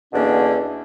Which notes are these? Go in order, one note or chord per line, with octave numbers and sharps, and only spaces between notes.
E2 B2 D3 A#3 C#4 D4